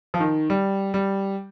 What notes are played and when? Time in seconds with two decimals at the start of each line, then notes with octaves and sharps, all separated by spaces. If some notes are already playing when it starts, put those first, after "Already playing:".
0.14 F3
0.20 D#3
0.50 G3
0.94 G3